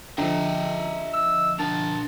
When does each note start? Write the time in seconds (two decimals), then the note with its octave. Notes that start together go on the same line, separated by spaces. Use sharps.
0.18 D3 F3 D#5 E5 G5 A#5
1.14 E6
1.59 D4 A#4 A5